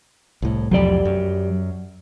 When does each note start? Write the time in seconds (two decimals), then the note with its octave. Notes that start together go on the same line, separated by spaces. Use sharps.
0.42 C2 A2
0.71 C2 F2 F#3 G4 D5
1.05 F#2